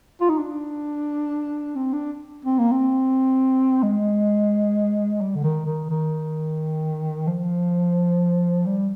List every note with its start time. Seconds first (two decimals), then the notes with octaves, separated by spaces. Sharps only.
0.21 F4
0.29 D#4
0.39 D4
1.75 C4
1.93 D4
2.45 C4
2.59 A#3
2.71 C4
3.83 G#3
5.21 G3
5.35 D3
5.43 D#3
5.66 D#3
5.90 D#3
7.27 F3
8.66 G3